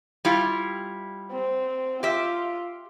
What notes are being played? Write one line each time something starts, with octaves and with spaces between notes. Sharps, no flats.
G3 E4 F4
C4
F4 G4 E5